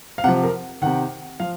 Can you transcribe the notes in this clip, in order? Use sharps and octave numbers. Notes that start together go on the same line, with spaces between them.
F5
C3 F3 F#5
A#4
C3 D#3 F#5
F3 F5